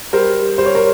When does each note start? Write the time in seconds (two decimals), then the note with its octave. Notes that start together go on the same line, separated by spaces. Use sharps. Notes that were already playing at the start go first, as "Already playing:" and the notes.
0.13 G3 A#4 C5
0.58 G3 C5
0.66 C#5
0.75 A#4 C5